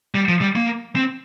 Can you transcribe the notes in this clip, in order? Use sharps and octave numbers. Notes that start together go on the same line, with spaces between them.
G3
F3
G3
A#3
C4